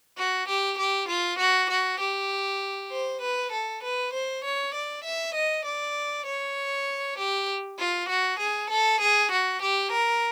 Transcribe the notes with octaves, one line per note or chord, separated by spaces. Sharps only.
F#4
G4
G4
F4
F#4
F#4
G4
C5
B4
A4
B4
C5
C#5
D5
E5
D#5
D5
C#5
G4
F4
F#4
G#4
A4
G#4
F#4
G4
A#4